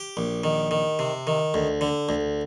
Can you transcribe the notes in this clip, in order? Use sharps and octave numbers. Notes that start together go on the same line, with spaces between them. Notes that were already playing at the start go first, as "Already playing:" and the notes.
Already playing: G4
A#1
D#3
D#3
C3
D#3
D2
D3
D2